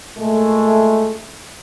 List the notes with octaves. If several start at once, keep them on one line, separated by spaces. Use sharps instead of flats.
A#2 G#3 A3